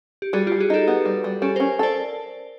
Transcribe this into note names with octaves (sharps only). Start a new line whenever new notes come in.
G4
G3 F#4 G#4
F4 G4
G3
F#4 G#4
D#4 G4 A4
B3
G3
G3
C#4 G4 A4
A#4 C5
C#4
A4 C5 D5